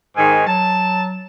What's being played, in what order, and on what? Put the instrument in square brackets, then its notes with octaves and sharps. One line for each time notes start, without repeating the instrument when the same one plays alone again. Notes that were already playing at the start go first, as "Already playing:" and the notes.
[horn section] G#2 D#3 [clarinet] G#5
[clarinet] F#3 [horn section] A5